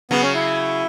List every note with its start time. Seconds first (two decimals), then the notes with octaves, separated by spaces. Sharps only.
0.11 C#3 F#3 B3
0.22 C#4
0.34 E4